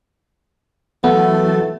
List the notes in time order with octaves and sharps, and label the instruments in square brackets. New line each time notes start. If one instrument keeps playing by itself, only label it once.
[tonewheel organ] E3 F#3 A5 [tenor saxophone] A3 [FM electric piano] B3